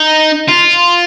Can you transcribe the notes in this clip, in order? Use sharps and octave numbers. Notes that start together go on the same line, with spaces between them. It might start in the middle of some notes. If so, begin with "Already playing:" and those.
Already playing: D#4
F4